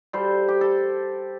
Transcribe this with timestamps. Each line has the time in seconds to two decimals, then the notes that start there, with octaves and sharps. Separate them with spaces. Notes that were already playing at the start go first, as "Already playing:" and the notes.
0.13 G3 A4 C5
0.48 G4
0.61 A4